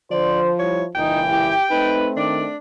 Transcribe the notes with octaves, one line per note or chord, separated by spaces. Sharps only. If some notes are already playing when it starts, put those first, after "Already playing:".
D3 F3 C5 D5
G3 E4 C#5
C#2 A#2 E3 D#4 G5
E4 G4
A3 C4 D#4 B4
D#3 D4 D5